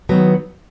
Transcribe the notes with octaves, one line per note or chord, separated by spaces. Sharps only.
D#3 F#3 B3